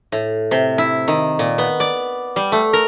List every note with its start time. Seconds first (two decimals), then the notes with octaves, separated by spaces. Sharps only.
0.12 A2
0.51 C3
0.78 E4
1.08 D#3
1.39 A#2
1.58 B3
1.80 D5
2.36 G3
2.52 A3
2.73 A#4